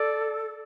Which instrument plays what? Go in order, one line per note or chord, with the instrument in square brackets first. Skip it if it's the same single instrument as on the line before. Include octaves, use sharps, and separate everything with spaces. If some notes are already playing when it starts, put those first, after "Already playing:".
Already playing: [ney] A4 [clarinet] D5